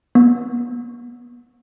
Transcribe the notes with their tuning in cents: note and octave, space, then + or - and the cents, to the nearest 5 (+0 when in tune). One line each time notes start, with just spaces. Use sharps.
B3 -35